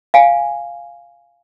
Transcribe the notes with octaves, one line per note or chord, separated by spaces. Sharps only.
F5 G#5